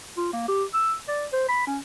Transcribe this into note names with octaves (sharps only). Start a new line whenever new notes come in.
F4
A#3
G4
E6
D5
C5
B5
C#4